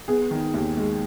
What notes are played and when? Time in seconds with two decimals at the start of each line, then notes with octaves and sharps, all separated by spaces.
0.08 B3 G#4
0.31 D#3
0.54 D#2
0.77 G#3